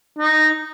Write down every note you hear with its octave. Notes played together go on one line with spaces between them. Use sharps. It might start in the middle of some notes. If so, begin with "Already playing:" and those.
D#4